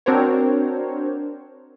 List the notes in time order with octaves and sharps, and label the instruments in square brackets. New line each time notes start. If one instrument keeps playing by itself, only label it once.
[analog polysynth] C4 D4 F#4 A#4 C5 C#5